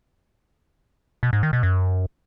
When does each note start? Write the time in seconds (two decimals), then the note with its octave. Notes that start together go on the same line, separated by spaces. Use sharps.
1.23 B2
1.33 G#2
1.43 D#3
1.53 B2
1.63 F#2